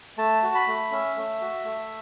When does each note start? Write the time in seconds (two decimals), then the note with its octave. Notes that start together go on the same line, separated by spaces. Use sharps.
0.18 A3 A5
0.43 F#4
0.55 B5
0.67 A3
0.91 C#4 E5
1.16 A3
1.41 F#4
1.65 A3